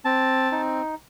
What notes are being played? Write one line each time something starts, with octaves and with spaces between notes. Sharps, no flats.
C4 A5
D#4